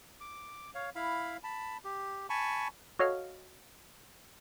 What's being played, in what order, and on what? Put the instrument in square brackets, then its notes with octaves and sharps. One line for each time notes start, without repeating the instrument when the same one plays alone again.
[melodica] D6
C#5 F5
E4 F5 B5
A5 B5
G4
G#5 A5 B5 C#6
[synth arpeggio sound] F#4 A4 C#5 D#5 F5 F6